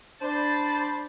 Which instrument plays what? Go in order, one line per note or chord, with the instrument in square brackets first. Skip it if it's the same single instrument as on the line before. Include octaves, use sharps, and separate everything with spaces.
[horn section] D4 C5 [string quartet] B5 A6